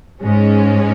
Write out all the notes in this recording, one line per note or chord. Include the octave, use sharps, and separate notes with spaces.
G#2 G#3 C#4